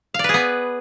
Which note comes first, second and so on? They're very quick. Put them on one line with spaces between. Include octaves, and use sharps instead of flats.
F5 D5 B4 G#4 B3